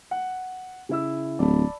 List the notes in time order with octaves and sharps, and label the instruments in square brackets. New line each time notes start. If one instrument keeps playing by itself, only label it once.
[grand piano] F#5
C#3 E4 E6
[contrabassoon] D1 [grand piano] D5 A5 B5